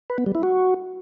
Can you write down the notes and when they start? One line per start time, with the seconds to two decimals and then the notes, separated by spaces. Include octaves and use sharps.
0.10 B4
0.18 B3
0.26 G3
0.35 E4
0.43 F#4